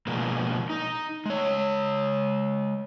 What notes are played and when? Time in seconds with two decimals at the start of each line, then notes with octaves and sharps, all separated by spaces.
0.07 B2 F3 G#3 A#3
0.70 D#4
1.26 G#3 C#5